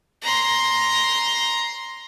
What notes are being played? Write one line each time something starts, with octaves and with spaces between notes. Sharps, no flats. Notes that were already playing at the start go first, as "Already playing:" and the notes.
A#5 C6